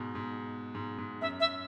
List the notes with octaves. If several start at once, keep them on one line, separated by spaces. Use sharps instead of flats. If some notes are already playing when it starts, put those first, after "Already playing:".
Already playing: G#2 B2
G#2
G#2
G#2
F#2 E5
E5